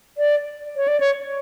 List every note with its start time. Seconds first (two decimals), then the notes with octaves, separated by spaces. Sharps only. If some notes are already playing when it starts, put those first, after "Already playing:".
0.18 D5
0.76 C#5
0.88 D5
1.00 C#5